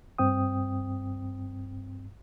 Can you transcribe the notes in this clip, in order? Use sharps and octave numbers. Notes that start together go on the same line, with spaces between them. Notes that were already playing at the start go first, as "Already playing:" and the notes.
G2 C4 G5 D#6